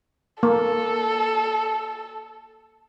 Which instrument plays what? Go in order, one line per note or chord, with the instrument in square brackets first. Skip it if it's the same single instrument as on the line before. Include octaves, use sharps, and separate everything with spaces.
[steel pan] A#3 [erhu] A4